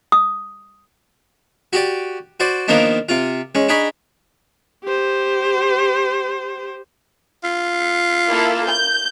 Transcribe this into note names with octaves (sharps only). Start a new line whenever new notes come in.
D#6
F#4 G4 D5
F#4 C5 D5
D#3 F3 A#3 B3 D4 D#4
C3 F4
G#3 C#4
D4 D#4 G#4 G#5 B5 C#6
G4 C5
F4
A#3 E4 A4
G6